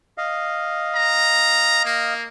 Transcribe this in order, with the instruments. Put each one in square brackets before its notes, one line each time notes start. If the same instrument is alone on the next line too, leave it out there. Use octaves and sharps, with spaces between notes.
[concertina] D#5 F5
[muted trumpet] A#5
A#3